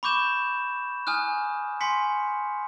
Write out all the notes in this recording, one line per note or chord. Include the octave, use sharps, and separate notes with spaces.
B5 C#6 D6 G6 E7
G#5 D#6 F6 F#6
G#5 C6 B6 C#7